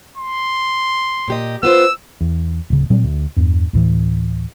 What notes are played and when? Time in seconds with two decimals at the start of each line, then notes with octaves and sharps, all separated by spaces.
0.18 C6
1.28 A#2 G4 D#5
1.63 B3 F4 C5 E6
2.21 E2
2.70 D1 C#3
2.90 A#2 F#3 G3 C4
3.03 D2
3.37 E2 G2
3.73 D2 A2 E3